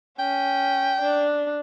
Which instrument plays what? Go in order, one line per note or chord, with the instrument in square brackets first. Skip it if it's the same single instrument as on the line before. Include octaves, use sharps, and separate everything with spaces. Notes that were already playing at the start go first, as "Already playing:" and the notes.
[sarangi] C#4 [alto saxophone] G5
[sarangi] D4